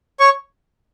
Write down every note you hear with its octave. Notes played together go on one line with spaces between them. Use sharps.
C#5 C#6